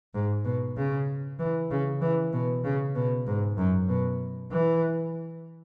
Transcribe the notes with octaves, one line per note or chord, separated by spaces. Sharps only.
G#2
B2
C#3
E3
C#3
E3
B2
C#3
B2
G#2
F#2
B2
E3